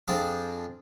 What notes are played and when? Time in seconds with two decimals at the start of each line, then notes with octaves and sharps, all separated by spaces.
0.08 F2 F3 C4 D4 G#4 D6